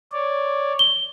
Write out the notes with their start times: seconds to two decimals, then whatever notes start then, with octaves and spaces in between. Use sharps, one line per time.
0.12 C#5 D5
0.79 G7